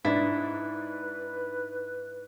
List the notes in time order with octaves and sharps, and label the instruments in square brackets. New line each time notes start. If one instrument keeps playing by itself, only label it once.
[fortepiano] G#2 D4 [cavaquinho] E4 [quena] B4